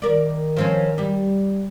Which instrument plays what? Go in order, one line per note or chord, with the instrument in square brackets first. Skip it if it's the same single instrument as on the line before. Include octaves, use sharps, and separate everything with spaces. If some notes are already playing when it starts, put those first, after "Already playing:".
[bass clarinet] D#3 [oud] A#4 D5
[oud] F3 C4 C#4
G3